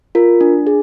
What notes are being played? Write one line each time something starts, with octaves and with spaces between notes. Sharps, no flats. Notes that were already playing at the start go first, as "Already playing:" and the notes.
F4 A#4
D4
G#4